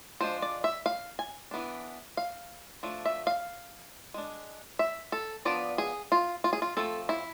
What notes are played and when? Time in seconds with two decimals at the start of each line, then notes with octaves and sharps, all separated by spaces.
0.21 F3 G#3 D4 C5
0.42 D5
0.64 E5
0.86 F5
1.19 G#5
1.51 E3 B3 D4
2.17 F5
2.83 F3 A3 D4
3.05 E5
3.27 F5
4.14 G#3 D4
4.79 E5
5.12 A4
5.45 F3 B3 D4 D5
5.78 G#4
6.12 F4
6.44 F4
6.53 G#4
6.62 F4
6.77 F3 A3 C4 A4
7.09 E4